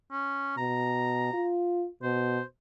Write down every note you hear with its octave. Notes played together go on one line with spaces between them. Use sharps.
C#4
B2 A#5
F4
B2 C5